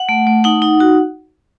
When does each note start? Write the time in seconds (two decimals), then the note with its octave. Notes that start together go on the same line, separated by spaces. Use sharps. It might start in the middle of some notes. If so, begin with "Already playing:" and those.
Already playing: F#5
0.09 A3
0.27 A3
0.44 D#4 F#5
0.62 D#4
0.80 F#4